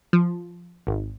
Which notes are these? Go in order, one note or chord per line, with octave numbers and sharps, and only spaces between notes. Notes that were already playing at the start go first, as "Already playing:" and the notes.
F3
G#1